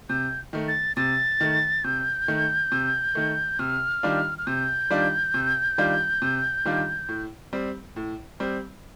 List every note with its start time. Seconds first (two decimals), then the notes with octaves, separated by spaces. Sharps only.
0.09 C3 G6
0.53 D#3 A3
0.68 A6
0.96 C3 A6
1.41 D#3 A3
1.84 C3 G6
2.28 D#3 A3
2.72 C3
3.15 D#3 A3
3.59 C3 F6
4.03 D#3 G3 D4 F4
4.38 F6
4.47 C3 G6
4.91 D#3 G3 D4 F4
5.34 C3
5.78 D#3 G3 D4 F4
6.22 C3
6.65 D#3 G3 D4 F4
7.09 A2
7.53 G3 C4
7.96 A2
8.40 G3 C4